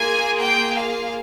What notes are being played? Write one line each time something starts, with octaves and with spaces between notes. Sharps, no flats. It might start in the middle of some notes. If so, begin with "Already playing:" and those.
Already playing: A#3 F4 G#4 G#5
G5
F5